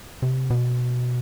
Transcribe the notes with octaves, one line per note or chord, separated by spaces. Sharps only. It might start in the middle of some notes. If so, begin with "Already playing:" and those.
C3
B2